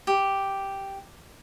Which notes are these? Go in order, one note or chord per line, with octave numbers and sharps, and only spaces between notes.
G4